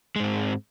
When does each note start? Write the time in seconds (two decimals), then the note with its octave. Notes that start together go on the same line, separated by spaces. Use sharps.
0.16 G#3
0.20 G#2
0.24 C4